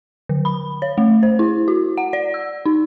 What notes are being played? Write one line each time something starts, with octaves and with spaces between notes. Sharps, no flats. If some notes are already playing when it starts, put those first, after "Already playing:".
D3
B5
C#5
A3
C5
E4
F#4
F#5
D5
E6
D#4